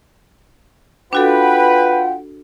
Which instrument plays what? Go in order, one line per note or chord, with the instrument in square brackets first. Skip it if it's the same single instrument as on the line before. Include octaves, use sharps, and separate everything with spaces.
[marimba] D4 F#4 A4 [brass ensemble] F4 F#5 [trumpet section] B4 [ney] G5